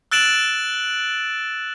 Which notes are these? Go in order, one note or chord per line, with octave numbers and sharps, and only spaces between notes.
E6 F#6 A6 D7 E7 F#7